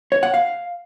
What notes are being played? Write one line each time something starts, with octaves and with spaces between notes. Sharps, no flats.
C#5
F#5
F5